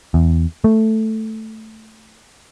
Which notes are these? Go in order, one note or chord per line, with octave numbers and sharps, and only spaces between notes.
E2
A3